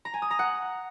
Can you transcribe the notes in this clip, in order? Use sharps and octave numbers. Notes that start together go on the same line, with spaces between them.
A#5
G#5
D#6
A#5
F#5